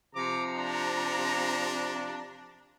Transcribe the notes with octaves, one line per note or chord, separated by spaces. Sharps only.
C3 F3 A#5 D6
D4